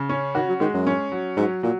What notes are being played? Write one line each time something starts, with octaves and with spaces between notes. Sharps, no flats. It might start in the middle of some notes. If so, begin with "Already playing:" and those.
Already playing: C#3
C#4
D#3 F#4
F#3
D#3 G#3
F#2
C#4
F#3
G#2 F#3
A#2 F#3